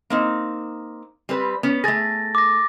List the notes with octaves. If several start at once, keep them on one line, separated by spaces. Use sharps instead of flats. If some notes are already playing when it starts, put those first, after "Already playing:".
A#3 C4 D#4
G3 C4 B4
B3 C#4
A3 G#4 A6 A#6
D6 A#6